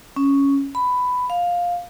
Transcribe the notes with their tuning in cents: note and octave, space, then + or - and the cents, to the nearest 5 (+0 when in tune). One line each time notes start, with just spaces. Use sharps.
C#4 +0
B5 +10
F5 +10